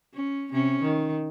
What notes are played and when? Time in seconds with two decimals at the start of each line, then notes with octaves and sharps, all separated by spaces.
0.14 C#4
0.52 C3 C#4
0.82 D#3